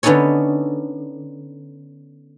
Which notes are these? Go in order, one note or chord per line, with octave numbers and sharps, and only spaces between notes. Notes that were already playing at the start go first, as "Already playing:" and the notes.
D3 B3 C#4 D#4 A4 C#5